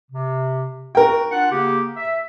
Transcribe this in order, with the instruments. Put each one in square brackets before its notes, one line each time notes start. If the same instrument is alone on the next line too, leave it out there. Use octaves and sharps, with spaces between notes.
[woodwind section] C3
[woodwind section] F#4 [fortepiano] A#4 G5
[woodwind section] D4 F4 F#5
C#3 A#3 G4
E5